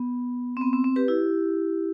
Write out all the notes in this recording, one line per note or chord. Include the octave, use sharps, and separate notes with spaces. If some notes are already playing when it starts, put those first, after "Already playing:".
Already playing: B3
C4
B3
C4
C4
G4 B4
E4 G4